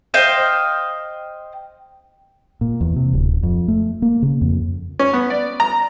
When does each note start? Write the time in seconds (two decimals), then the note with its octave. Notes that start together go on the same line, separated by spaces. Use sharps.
0.14 C5 D#5 F5 G5
2.61 A#2
2.81 E2
2.96 C3
3.13 D1
3.43 F2
3.68 A3
4.02 A#3
4.22 C#3
4.41 F2
4.99 C#4
5.13 B3
5.30 D5
5.60 A#5